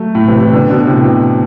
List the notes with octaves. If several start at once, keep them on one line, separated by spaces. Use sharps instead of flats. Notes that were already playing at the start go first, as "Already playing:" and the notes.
Already playing: F#3 A3
A2
C3 E3
C3 E3
B2 D3
B2 D3
A2 C3
B2